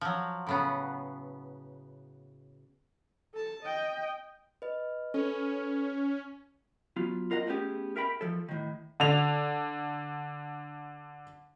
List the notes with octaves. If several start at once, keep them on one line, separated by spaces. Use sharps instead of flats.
F3 F#3
A2 C#3 B3
A4 A5
D#5 G5
B4 D#5
C#4 A4 B4
F#3 B3 F4
F4 A#4 D#5 F#5
A3 B3 C#4 G4 G#4
A#4 E5 G5 B5
F3 A4
A2 D#3
D3 F7